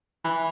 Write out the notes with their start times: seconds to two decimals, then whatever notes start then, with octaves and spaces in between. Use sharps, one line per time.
0.25 E3